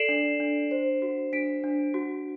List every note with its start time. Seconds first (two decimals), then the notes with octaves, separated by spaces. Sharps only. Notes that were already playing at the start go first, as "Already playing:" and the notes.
Already playing: A4 D5 C7 D7 E7 F#7
0.09 D4
0.40 D4
0.71 C5
1.02 F#4
1.33 D4 B6 D7
1.64 D4
1.94 F#4